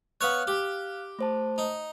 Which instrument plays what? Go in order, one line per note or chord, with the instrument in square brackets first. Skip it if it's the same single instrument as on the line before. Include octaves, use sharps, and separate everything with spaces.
[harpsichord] B3 C#5 [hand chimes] F5 F6 F#6
[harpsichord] G4
[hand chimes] A3 C5 A5
[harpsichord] D#4